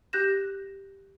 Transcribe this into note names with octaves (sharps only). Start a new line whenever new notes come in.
G4 F#6 G6 A#6 E7